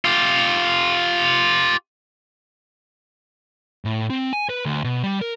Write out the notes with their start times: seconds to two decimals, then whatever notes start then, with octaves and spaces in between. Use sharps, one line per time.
0.05 F4 G4
3.85 A2
4.10 C4
4.33 G#5
4.49 B4
4.66 D2
4.84 B2
5.03 G3
5.21 A#4